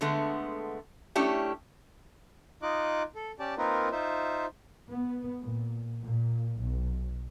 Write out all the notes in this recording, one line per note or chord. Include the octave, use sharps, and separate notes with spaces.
D3 G#3 A3 B3
A3 C#4 D4 E4 G4
D#4 F4 D#5 D6 F#6
A4
C#4 G4 D5 A5
A#3 C4 D#4 F4 A#4 B4
D#4 F4 C5 E5
B3
A#2
A#2
B1